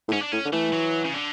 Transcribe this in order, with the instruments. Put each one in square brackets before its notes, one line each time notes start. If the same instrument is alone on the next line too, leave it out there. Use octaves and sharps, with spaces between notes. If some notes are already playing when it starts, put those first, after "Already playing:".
[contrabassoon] A2
[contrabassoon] G#2 [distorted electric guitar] C#4
[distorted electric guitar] D4
[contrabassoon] A2 [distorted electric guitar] C#4
[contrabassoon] D3
[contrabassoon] E3 [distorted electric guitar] A3
[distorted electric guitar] F#3
C#3
D3